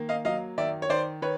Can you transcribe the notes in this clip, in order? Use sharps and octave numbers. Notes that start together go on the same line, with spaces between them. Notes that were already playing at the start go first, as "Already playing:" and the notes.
Already playing: D#3 A#3
D#5 F5
F#3 D#5 F5
D#3 D5 E5
C#5
D#3 C5 D5
D#3 B4 C#5